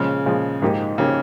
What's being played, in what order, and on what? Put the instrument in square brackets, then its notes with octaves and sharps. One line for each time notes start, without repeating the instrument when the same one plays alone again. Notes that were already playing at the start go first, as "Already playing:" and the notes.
Already playing: [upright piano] A#2 F3 G#3 [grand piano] C#3
[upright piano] A#2 F3 G#3
G#2 F3 A#3 D#4 G4
[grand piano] C#3 [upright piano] F3 A#3 D#4 G4